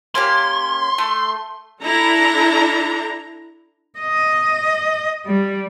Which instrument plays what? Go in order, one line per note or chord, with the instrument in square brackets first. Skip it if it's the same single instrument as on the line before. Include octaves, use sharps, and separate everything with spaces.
[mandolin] A#3 C#4 G4 [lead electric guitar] C6
[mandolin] A3
[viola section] D4 E4 A4 A#5
[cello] D#5
G3